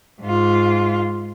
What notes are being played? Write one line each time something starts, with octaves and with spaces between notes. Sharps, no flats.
G#2 F4